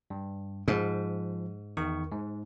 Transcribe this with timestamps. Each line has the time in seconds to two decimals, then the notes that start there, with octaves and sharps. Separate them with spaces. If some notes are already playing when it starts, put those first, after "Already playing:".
0.10 G2
0.68 G#2 F3
1.77 E2 D#3 C#6
2.12 G#2